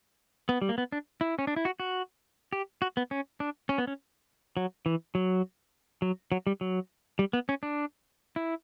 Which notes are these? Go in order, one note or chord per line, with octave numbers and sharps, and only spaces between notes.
B3
G3
A#3
B3
D4
E4
C#4
D4
E4
F#4
F#4
G4
F#4
B3
C#4
D4
C#4
B3
C#4
F#3
E3
F#3
F#3
F#3
G3
F#3
G3
B3
C#4
D4
E4